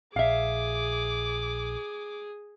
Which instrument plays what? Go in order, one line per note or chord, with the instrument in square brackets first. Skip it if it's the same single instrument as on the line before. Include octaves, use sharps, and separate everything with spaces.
[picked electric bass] A#1 [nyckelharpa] G#4 [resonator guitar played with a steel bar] E5 F5 [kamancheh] D6